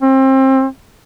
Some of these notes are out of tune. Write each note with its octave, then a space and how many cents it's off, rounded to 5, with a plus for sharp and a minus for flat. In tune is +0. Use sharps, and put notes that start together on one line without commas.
C4 +30